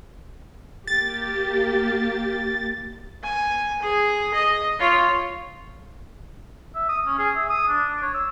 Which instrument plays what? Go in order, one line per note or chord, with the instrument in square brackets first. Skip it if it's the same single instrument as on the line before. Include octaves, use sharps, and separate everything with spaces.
[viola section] A#3 G4 [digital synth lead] A6
[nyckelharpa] G#5
G#4
D#5
F4 C#5
[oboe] E5
D#6
C#4
G#4
E5
D#6
D4
D4
C#5
E6